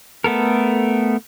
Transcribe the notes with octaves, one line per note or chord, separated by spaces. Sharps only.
A3 B3 A4 A#4